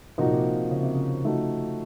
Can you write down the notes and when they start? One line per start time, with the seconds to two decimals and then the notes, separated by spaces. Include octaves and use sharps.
0.18 C3 F3 A#3 D#4 F#4
0.26 A#2
0.33 C3
0.71 C#3
0.83 C3
0.95 C#3
1.24 F3 A3 D#4 F#4